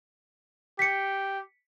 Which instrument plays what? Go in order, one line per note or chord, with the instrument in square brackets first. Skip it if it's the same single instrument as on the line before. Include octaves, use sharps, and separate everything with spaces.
[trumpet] G4 [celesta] B6 C#7